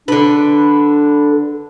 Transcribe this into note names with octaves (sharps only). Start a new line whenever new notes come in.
D3 D4 B4